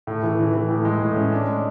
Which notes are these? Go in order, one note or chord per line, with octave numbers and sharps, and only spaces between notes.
A2
E3
E3
E3
A2
G#3
A2
C#4
D4
G#3